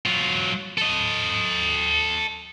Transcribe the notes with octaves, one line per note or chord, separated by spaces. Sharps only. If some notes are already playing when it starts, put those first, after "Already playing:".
F#3 F4
A4 D#5